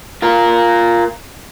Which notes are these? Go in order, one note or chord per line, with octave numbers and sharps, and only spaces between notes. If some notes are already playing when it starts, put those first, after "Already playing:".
F4 A#4